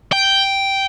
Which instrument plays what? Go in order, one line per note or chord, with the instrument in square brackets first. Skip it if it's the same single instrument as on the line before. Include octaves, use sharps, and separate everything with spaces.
[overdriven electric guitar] G5